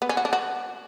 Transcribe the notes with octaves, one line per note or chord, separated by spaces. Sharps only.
B3
C#4
F#4
D4
F#4